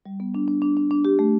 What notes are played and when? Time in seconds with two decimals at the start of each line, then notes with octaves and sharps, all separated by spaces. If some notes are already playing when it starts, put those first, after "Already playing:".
0.06 G3
0.20 B3
0.35 D4
0.48 D4
0.62 D4
0.77 D4
0.91 D4
1.05 G4
1.19 A3